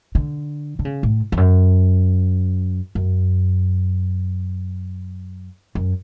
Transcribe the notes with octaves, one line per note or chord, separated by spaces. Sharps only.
D3
D3
C#3
A2
F2
F#2
F#2
F#2